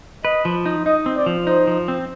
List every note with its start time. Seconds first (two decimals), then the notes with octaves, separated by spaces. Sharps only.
0.25 B4 D#5
0.45 F3
0.66 D#4
0.86 D#4 D#5
1.06 C4
1.16 D5
1.26 F3
1.47 D#4 C5
1.67 F3
1.88 C4